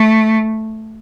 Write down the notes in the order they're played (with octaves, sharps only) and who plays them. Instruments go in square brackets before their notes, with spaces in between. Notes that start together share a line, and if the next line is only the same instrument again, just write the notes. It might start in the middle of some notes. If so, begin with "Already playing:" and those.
Already playing: [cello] A3